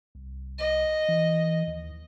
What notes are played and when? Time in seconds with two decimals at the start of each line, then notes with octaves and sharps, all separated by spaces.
0.15 C2
0.59 D#5
1.08 E3
1.67 D#2